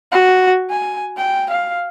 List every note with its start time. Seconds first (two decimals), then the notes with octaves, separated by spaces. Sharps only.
0.12 F#4
0.70 G#5
1.17 G5
1.50 F5